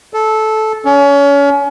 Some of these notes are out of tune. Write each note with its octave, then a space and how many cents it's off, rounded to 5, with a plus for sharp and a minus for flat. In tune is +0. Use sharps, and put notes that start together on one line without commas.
A4 -15
C#4 +30